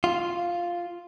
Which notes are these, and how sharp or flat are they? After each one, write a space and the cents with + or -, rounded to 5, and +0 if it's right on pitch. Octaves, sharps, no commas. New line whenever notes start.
F4 +0